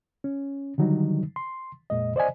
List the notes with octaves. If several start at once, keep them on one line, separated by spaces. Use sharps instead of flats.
C#4
D3 D#3 F#3 G3 D#4
C6
F2 A#2 G#3 D#5
C5 D5 D#5 G#5